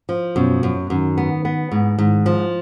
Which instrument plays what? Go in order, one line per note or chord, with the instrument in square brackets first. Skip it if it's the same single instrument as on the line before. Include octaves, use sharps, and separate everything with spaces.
[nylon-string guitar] F3
[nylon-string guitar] F#2 [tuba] B2
[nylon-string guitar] F#2
[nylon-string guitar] F#2 [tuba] D#3
[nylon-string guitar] B3
B3
G#2
[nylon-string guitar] G#2 [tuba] D#3
[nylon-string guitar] F3